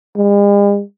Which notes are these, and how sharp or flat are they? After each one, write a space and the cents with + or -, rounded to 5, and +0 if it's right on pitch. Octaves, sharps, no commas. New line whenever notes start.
G#3 -45